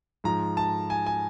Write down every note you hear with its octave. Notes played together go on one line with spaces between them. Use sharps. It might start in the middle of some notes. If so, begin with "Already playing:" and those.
G#2 F3 A#5
A5
G#5
G#5